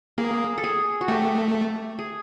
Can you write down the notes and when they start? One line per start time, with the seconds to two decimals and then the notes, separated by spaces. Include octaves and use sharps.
0.18 A#3 G#4
0.58 A4
0.64 G#4
1.01 F#4
1.08 A3 G4
1.99 G#4